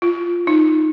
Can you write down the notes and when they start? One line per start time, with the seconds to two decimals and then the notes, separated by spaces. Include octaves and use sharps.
0.02 F4
0.47 D#4